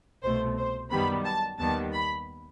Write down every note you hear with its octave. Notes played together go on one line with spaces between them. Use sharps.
C2 B2 A3 C5
C5
F#2 D#3 G3 B3 B5
A5
D#2 D#3 G3 B3 A5
B5